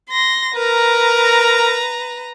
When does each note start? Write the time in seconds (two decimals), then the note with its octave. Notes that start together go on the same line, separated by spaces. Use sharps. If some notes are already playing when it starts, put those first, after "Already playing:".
0.10 C6 A#6
0.55 A#4 B4 A#5